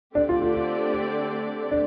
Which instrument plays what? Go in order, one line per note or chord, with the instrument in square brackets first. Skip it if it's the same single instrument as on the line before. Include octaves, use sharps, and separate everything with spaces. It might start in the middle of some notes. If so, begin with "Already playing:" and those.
[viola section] D3 A3 C4 G4 D5 [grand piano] D4
[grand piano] F4
F4
F4
D4